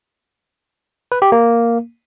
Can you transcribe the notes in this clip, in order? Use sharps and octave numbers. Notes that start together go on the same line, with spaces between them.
B4
G4
A#3